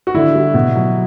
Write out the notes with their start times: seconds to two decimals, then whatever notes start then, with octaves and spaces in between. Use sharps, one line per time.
0.07 F#4
0.14 D3 E4
0.35 G3
0.54 B2
0.76 F#3